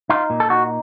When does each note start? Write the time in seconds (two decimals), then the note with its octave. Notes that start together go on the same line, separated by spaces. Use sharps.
0.09 D#4 F4
0.30 A#2
0.40 A4
0.50 D#4 F#4